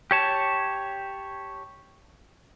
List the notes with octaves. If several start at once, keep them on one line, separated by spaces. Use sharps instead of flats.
G4 C#5 A5